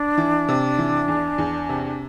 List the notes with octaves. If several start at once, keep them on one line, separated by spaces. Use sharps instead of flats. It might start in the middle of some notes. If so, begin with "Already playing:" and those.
Already playing: D4
E3
C3
E3
E2
E2
C3